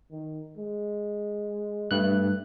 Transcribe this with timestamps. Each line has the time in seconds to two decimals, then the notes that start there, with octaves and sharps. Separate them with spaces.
0.11 D#3
0.57 G#3
1.91 G2 A3 F#6